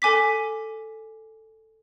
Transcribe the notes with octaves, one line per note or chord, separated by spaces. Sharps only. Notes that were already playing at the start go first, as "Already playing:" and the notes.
A4 G#5 D6 B6